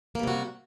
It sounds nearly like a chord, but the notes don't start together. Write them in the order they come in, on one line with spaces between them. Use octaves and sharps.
A#3 G3 C3 F#4